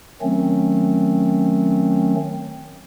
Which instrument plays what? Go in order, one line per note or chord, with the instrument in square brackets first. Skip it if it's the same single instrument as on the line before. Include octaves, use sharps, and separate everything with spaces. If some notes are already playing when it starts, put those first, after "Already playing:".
[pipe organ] D#3 F#3 A3 C4 C#4